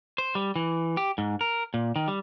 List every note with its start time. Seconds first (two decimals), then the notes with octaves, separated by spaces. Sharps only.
0.18 C5
0.35 G3
0.56 E3
0.97 G4
1.18 G#2
1.41 A#4
1.74 A#2
1.96 D#3
2.08 G3